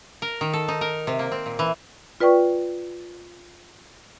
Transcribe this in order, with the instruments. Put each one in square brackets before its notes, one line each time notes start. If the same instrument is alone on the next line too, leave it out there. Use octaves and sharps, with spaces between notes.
[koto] A#4
D#3
A4
D#4
A#4
C3
A#3
C4
A#2
E3
[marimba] F4 B4 D5 G5 C#6